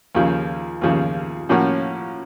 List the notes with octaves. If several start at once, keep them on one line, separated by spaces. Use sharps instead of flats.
D#2 C#3 F3
D#2 C#3 F3
A2 F3 A#3 C#4 F#4